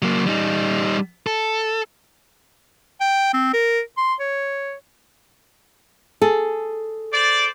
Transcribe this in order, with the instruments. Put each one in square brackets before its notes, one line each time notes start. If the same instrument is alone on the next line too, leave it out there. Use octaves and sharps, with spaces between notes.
[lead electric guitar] F#3 A#3
G3 D#4
A4
[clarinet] G5
C4
A#4
C6
C#5
[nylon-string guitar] G#4 A4
[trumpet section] C5 D5